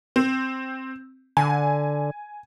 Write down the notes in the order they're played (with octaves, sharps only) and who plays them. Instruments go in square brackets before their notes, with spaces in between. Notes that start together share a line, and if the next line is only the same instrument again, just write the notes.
[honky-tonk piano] C4
[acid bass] D3 [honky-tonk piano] G#5